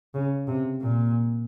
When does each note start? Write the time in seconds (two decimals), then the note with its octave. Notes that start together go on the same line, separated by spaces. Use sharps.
0.14 C#3
0.48 C3
0.81 A#2